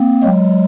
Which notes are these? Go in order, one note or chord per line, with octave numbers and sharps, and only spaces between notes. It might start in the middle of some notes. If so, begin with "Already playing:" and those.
Already playing: A#3 C4
F#3 G#3